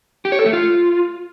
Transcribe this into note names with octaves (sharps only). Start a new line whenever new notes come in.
G4
C#5
A4
A3
F4